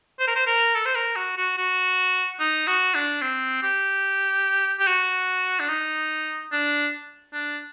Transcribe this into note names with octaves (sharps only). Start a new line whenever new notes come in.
C5
A#4
C5
A#4
A4
C5
A#4
F#4
F#4
F#4
D#4
F#4
D4
C4
G4
G4
F#4
D4
D#4
D4
D4